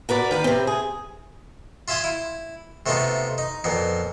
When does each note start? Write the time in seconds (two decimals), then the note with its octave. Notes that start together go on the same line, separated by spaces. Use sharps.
0.09 F#4 A#4 B4 D5
0.31 D#3 B4 F5
0.44 C3 C4
0.67 G#4
1.88 F4 E5 F5 G#5 C6 D#6
2.04 E4
2.86 C3 A3 B3 D#4 F4
3.38 D#4
3.64 F2 A#2 B3